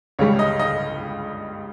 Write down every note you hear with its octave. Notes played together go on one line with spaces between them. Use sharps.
C#2 C#3 G3 C#5
D#5
D#5